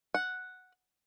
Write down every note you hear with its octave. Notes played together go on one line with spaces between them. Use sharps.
F#5